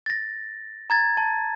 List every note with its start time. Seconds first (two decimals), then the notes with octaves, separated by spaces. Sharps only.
0.06 A6 A#6
0.90 A#5 G#6 A6
1.17 A5